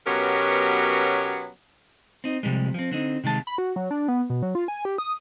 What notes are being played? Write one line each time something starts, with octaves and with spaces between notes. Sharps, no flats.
B2 F#3 B3 C#4 G4 A#4
C4 D#4
C3 F3 G3 G#3
F3 C4
D3 C4 D#4
C3 D#3 G#3 A5
B5
F#4
F#3
D4
B3
B2
F#3
F4
G#5
G4
D#6